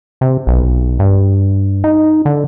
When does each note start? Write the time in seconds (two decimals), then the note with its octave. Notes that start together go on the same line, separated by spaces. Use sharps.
0.21 C3
0.47 B1
0.99 G2
1.84 D#4
2.25 D3